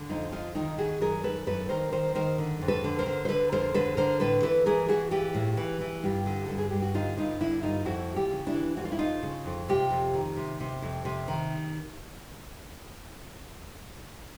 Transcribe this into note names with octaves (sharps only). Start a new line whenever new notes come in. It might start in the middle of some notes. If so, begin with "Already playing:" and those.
Already playing: D3
F2 D#4 F4
D3 D#4 F4
D#3 D#4 F4
D#3 F#4 G#4
F#2 G#4 A#4
D#3 A4 B4
F#2 A4 B4
D#3 A#4 C5
D#3 A#4 C5
D#3 A#4 C5
D3
F2
A4 B4
D3
A#4 C5
D3
C5
D3 A4 B4
F2 A#4 C5
D3 A4 B4
D3 A#4 C5
A2 A4 B4
E3 A4 B4
E3 G#4 A#4
E3 F#4 G#4
E3 F4 G4
A2
E3
E3
G2 F4 G4
D3
G2 A4
G#4
G2 G4
F#4
D3 D#4 F4
G2 D#4 F4
D3 D4 E4
G2 D#4 F4
F2 E4 F#4
E3
F4 G4
C#3
D4 E4
E3
F2 F#4
F4
E4
F2 D#4 F4
C#3
F2
C3 F4 G4
F2
D#3
C3
C3
F2
C3
D#3